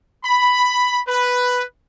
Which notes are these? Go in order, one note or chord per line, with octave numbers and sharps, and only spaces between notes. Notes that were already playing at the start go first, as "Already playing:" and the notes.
B5
B4